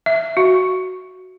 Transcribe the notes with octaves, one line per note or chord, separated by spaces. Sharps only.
E5
F#4